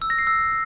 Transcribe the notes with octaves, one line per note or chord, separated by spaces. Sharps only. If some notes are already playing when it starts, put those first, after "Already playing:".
E6
A#6
C7
E6